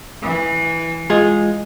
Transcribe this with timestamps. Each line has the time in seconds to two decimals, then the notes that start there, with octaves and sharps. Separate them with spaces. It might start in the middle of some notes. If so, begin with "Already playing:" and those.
0.23 E3
1.10 G#3 F4 G#4